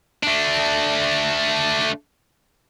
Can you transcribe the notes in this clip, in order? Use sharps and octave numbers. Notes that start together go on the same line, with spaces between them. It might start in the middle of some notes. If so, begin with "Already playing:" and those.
A3 D4